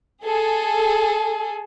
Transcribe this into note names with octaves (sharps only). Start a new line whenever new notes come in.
G#4 A4